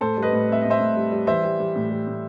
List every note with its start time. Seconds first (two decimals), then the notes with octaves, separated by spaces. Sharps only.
0.01 A2 A4 C5
0.17 G3
0.22 B4 D#5
0.32 A2
0.49 C4 E5
0.61 A2 D#5
0.70 C5 E5
0.80 A2
0.96 G3
1.12 G3
1.27 E3 C5 E5
1.43 G3
1.59 G3
1.75 A2
1.90 G3
2.07 A2